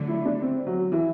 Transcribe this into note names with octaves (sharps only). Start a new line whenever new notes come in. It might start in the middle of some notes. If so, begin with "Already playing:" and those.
Already playing: D3 F#3 A3
E4
D4
C4
F#3
E3